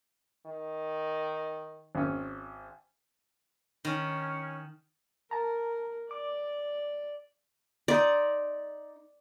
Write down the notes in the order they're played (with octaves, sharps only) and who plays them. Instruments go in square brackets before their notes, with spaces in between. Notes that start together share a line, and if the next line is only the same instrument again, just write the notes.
[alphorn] D#3
[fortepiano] G#1 C#4
[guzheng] D#3 [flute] C#4
[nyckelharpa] A#4 [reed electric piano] A5 A#5
[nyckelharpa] D5 [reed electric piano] D6
[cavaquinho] D#4 E4 C6 [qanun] D5